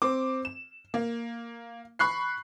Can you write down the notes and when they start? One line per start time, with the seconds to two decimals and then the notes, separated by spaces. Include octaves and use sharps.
0.02 C4 D6
0.45 E7
0.94 A#3
1.99 B5 C#6 F#6 C7